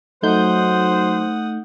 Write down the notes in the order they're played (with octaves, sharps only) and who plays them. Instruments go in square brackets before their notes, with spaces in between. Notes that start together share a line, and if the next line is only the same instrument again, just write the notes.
[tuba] F#3 [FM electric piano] A3 D#4 G6 [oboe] C5 [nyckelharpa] F#5 D#6